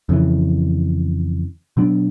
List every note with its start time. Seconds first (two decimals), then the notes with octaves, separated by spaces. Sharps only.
0.09 F2 C#3 E3
1.77 B2 F#3 B3 D4